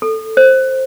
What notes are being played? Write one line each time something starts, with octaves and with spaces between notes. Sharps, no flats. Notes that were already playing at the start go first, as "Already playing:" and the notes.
A4
C5